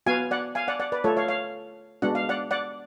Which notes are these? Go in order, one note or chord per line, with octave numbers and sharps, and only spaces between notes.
B3 F#4 F5 G#5
D5 F#5
F5 G#5
D5 F#5
D5 F#5
B4 D5
A3 F4 A4 C#5
C#5 F5
C#5 F5
G#3 B3 D4 F#4 F#5
F5
D5 F#5
D5 F#5